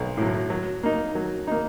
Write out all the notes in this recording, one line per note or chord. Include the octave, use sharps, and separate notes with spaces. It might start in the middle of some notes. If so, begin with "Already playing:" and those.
Already playing: B1
A2 F#3
F#3
A#3 D#4
F#3
A#3 D#4